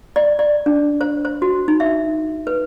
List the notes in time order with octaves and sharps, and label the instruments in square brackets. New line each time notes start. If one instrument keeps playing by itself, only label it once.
[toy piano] D5
D5
D4
C5
C5
F#4
D#4
E5
B4